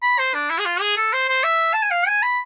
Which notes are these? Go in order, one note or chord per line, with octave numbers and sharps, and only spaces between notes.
B5
C5
D4
E4
G#4
F4
G#4
A4
C5
C5
E5
A5
G#5
F5
G#5
B5